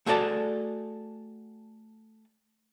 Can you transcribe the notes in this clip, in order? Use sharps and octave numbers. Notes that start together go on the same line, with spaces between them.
A3 F#4 G#4 A4 D5 A5